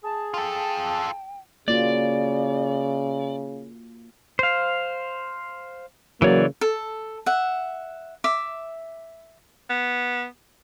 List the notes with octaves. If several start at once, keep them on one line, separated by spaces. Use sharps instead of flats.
G#4 A5
F4 A4 G5 A5
C#3 A#3 F4 F#4 D5
C5 F5
C#3 E3 F#3 A#3 C#5 D5
A4
E5 F#5
E5 D6
B3